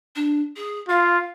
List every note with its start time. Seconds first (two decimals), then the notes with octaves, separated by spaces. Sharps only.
0.15 D4
0.56 G#4
0.89 F4 F5